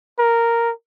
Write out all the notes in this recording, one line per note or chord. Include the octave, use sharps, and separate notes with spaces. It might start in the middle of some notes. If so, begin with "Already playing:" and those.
A#4